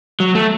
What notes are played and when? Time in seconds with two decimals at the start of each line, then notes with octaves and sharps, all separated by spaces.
0.20 F#3
0.35 A3